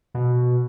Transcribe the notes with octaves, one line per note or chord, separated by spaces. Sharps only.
B2